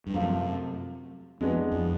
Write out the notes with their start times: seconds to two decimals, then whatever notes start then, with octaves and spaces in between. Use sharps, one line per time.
0.07 G2
0.14 F#2 C3 F3 A3 C4 F4
1.40 F2 E3 G#3 B3 D4 F#4
1.72 F2